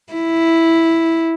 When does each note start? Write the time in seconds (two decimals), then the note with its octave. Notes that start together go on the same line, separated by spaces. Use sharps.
0.13 E4